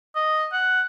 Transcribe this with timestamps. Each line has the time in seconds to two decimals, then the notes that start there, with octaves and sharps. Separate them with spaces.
0.16 D#5
0.53 F#5